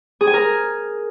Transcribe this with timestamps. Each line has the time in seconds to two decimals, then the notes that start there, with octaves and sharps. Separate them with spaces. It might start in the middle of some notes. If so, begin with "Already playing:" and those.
0.21 G#4
0.27 G#5
0.34 A#4